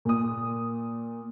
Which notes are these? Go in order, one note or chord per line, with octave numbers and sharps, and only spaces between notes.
A#2 D#6